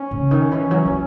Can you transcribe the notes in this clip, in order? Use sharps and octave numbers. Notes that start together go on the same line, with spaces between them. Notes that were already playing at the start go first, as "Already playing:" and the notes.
Already playing: C#4
C#3
D#3
E3
F#3
E3